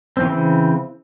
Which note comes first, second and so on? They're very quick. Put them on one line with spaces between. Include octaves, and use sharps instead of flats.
C4 E3 C#3